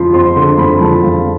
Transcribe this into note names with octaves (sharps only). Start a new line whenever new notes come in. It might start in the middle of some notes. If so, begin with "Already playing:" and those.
Already playing: F2 F3 B5 C6
F2 C6
D3 C6
F2 B5
F3 A5
F2 F5